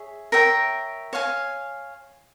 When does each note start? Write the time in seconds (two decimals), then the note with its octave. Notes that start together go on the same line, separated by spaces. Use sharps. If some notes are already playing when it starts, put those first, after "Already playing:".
Already playing: G#4 C#5 E5
0.32 A#4 C#5 E5 G5
1.13 C#5 F5 G#5